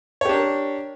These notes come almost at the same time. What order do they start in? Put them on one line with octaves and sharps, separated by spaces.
C#5 G4 D4 A#4